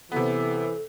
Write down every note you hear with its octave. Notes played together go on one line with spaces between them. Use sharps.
C3 E3 B3 A4